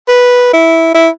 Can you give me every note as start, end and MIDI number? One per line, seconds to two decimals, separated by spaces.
0.08 0.51 71
0.53 0.91 64
0.94 1.09 64